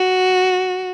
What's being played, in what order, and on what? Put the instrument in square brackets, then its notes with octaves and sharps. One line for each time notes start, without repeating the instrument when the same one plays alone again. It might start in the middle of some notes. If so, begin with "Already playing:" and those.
Already playing: [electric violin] F#4